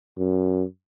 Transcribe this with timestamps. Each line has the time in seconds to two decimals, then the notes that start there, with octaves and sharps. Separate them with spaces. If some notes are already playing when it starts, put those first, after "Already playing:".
0.18 F#2